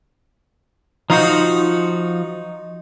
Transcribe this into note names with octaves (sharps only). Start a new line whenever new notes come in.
F3 D#4 F4 F#4